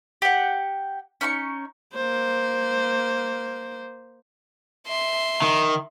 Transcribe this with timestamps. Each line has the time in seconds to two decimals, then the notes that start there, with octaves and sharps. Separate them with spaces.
0.22 G4 F#5
1.21 C#4 D#4 C6 C#6
1.94 A#3 C5
4.87 E5 C6
5.42 D#3